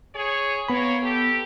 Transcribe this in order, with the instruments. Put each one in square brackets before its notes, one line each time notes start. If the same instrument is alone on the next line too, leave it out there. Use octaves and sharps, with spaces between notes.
[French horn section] G#4 C#5
[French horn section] A#3 C#5 [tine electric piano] B3 B5
[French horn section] G4 A4